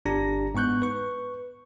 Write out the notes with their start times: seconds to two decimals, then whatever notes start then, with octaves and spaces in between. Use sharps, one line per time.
0.05 G1 D4 G4 A#5 A#6
0.55 G#2 B3 C#6 F#6 G6
0.82 B4 C#6